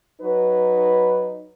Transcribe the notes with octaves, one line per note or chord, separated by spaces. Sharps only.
F#3 D#4 B4